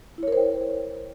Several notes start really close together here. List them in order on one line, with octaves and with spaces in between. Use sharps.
E4 C#5 A#4 C5 G5